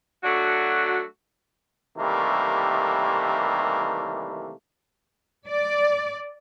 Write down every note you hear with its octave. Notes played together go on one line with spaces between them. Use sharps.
F#3 A3 D4 F#4
C3 D#3 E3 G3 A3 A#3
D5